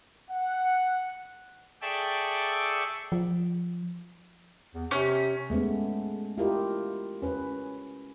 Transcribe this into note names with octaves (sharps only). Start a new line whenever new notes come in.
F#5
G#4 A4 D5 E5 G5 C#6
F3
E2
C3 C#4
G#3 A3 B3 C#4
E4 F4 G4 A#4 D#5
C#4 B4